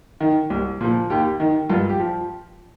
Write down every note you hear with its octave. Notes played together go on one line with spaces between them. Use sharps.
D#3
C2
A#2 F3
D#2 G4
D#3
G2 F4
G4
F3